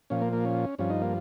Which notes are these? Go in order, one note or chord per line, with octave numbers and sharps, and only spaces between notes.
A#2 F3 C#4
A#3
A#3
C#4
G2 F3 C#4
D#4
A#3